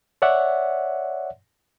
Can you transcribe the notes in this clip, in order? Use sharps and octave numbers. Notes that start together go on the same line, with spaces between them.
C#5 D5 E5 F#5